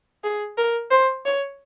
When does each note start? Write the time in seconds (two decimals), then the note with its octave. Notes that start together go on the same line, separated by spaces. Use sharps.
0.24 G#4
0.58 A#4
0.91 C5
1.26 C#5